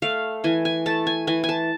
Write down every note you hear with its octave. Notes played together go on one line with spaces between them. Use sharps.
A3 F5
E3 G#5
G#5
A3 A5
G#5
E3 G#5
G#5
A5